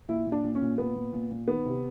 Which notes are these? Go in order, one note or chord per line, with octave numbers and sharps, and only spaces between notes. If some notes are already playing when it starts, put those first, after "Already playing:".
A#2 E4
A#2
D4
A#2
C#4
A#2
A#2 B3
A#2
A#2
A#2
D#3 B3
C3